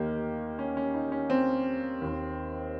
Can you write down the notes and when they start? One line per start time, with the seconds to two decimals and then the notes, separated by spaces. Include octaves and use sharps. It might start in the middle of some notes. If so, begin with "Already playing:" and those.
Already playing: D#2 D#3 A#3 G4
0.59 C#4
0.77 C#4
0.94 D#4
1.12 C#4
1.30 C4
2.02 D#2
2.07 D#3